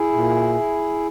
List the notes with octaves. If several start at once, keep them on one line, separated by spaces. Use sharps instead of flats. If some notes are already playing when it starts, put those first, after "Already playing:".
Already playing: E4 G#4
A#2